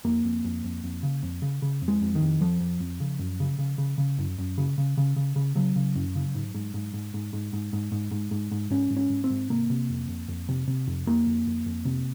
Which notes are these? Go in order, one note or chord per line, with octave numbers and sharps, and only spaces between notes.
F2 A#3
F2
F2
F2
F2
C#3
F2
C#3
C#3
F2
G#3
F2
D#3
F2
F2 F3
F2
F2
C#3
F#2
C#3
C#3
C#3
C#3
F#2
F#2
C#3
C#3
C#3
C#3
C#3
C#3 F#3
C#3
F#2
C#3
G#2
G#2
G#2
G#2
G#2
G#2
G#2
G#2
G#2
G#2
G#2
G#2
G#2 C#4
G#2
C#4
G#2
C4
G#2
C3 A#3
C3
F2
F2
F2
C3
C3
F2
F2 A#3
F2
F2
F2
C3